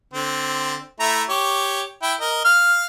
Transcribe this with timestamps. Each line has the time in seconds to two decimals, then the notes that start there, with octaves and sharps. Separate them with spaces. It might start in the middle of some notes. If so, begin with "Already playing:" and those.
0.14 D3 C4
1.00 A3 E4 A#5
1.29 G4 C#5
2.03 E4 G5
2.20 A#4 D#5
2.45 F5 F6